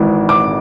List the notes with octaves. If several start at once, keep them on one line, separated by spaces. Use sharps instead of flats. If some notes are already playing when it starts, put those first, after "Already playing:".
Already playing: G#1 G#2 E3
D6